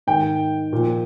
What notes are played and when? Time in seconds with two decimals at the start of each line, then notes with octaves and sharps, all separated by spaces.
0.07 G#2 D#3 G5
0.73 A#2 F3